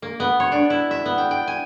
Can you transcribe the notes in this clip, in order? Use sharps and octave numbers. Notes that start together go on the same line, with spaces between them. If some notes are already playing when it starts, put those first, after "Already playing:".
A#3
B3
C#5
D4
E4
E5
B3
G5
G5
G#5